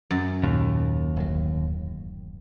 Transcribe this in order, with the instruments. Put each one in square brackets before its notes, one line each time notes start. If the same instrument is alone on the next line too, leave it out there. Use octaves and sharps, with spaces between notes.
[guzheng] F#2
[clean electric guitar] D#2 [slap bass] A#2
[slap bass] D1 G#1 F#3